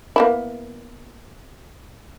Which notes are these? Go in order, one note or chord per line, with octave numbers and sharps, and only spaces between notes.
A#3 B3 E4